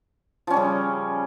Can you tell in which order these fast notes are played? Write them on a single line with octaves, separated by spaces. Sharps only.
F3 C#4 G3 C#3